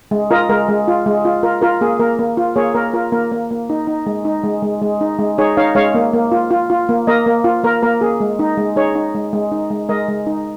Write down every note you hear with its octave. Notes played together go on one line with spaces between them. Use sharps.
G#3
F4 A#4 D#5
G#3 A#4
G#3
F4
G#3
F4
F4 A#4
F4 A#4
A#3 G#4
A#3 A#4
A#3
F4
A#3 G#4 C#5
A#3 A#4
F4 A#4
A#3 A#4
A#3
A#3
D#4
D#4
G#3
D#4
G#3
G#3
G#3
D#4
G#3
D#4 G#4 C#5
D#4 C#5 F5
G#3 C#5 F5
A#3
A#3
F4
F4
F4
A#3
A#3 A#4 D#5
A#3
F4
A#3 A#4
A#3 A#4
A#3 G#4
G#3
D#4
G#3
D#4 G#4 C#5
D#4
G#3
G#3
D#4
G#3
G#3 A#4 D#5
G#3
D#4